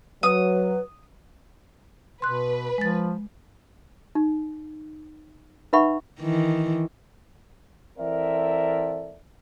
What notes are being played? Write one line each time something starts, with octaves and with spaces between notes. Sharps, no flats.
F#3 B4 D#6
B2 B4 C6 F#6
F3 G#3 A6
D#4
D#4 B4 E5 F#5 B5 C#6
D#3 E3
E3 C4 A4 A#4 D5 E5